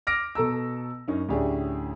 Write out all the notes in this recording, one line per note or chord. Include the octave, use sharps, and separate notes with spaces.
D6 F6 A#6 D7
B2 A4 A#5 E6
F#2 C#4 D#4
D2 A2 C#4 G4 G#4 D5